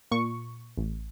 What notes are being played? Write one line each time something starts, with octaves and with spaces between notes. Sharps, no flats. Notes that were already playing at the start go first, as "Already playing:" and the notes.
A#2 C#6
A1